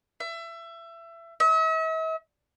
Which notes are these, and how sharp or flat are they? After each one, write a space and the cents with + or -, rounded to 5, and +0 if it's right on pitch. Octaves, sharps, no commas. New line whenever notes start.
E5 +25
E5 -45